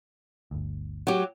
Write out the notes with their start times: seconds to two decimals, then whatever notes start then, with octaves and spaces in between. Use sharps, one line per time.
0.51 G1 D2
1.07 F#3 G4